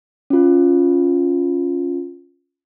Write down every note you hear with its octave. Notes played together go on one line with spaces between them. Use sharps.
C#4 F4